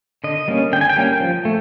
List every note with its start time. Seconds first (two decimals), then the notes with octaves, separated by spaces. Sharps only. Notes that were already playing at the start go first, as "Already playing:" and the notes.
0.24 D3 D#5
0.48 G3 A#3 C#4
0.73 D3 G5
0.81 G#5
0.90 G5
0.96 G3 A#3 C#4
1.20 F3
1.45 A3